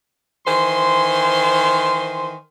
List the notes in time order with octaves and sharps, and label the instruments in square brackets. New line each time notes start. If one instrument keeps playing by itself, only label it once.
[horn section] D#3 E3 C5 G#5 C6